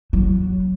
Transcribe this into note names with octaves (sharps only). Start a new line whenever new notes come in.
F#3